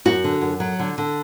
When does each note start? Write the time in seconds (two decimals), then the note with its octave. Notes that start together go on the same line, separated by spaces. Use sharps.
0.05 F#2 F#4
0.24 D3
0.41 F#2
0.60 F#3
0.79 D3
0.98 D3